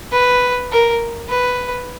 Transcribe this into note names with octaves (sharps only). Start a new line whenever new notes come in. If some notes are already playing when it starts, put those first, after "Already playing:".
B4
A#4
B4